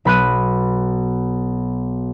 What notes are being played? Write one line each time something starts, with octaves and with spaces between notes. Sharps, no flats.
B1 B5 F#6 D#7